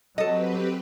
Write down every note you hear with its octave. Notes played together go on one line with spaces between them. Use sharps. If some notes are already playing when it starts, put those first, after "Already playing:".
F#3 C4 G4 A4 B4 D#5